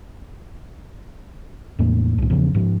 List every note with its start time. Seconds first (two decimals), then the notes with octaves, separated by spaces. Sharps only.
1.79 E2 A2 A#3
2.18 C2 A2
2.30 E2 C#3 F3
2.55 G#2 F3